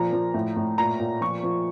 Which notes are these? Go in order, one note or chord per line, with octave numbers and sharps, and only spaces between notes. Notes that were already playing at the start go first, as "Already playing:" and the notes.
Already playing: A#2 F3 A#5
F3
A2
A2
A#2 A#5
A#2
F3 C#6
F3